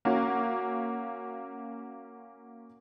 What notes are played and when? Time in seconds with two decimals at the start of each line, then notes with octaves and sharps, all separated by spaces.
0.05 A#3 C#4 F#4